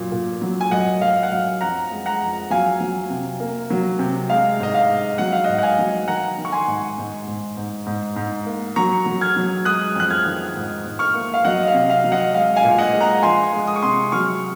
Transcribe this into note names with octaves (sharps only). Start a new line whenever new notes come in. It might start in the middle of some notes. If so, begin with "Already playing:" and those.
Already playing: F#2 A#2
A#2
F#3
G#5
F#2 D#5 F#5
F#2 F5
F#5
F#2 F5
F2 F#5 A#5
G#3
F#5 A#5
F2
F#3 F5 G#5
F#3
C3
A#3
F#3
C3
G#3 F5
G#2 D#5
F5
G#2
F#3 F#5
F5
G#2 D#5 F#5
F#5
F5 G#5
F#3
D#3 F#5 A#5
D#3
C#6
G#5 C6
G#2
G#2
G#2
G#2
G#2
G#2
A#3
F#3 A#5 C#6
F#3
F6 G#6
F#3
G#3 D#6 F#6
F2 F#6
F6 G#6
D#3
G#2
G#2
C#6 F6
A#3
F5
F#3 D#5 F#5
D#5
F5
C3
F5
F#3
D#5 F#5
G#3 F5
F5 G#5
A#2
D#5 F#5
G#3
F#5 A#5
F3 G#5 C6
G#3
D#6
C#6
C3 C6 D#6
F#3 C#6 F6